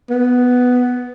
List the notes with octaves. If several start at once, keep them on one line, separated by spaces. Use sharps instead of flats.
B3